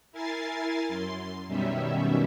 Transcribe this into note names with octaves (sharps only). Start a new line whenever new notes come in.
E4 A#4 G#5 A6 C7
F#2 C6
F#2 B2 D#3 G3 C#4 E5